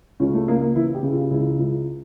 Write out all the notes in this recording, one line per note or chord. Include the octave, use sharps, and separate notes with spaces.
C#2 C#4
A3
C#3 A#3
A#3
E3 E4
G4
C#3
F4
C#2 E4
C#2